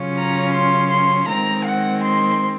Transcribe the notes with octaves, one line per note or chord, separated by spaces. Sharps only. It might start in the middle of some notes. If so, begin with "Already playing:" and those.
Already playing: C#3 F#3 C#4 F4
A#5
C6
C6
D#3 G#3 C4 A#5
F#5
C6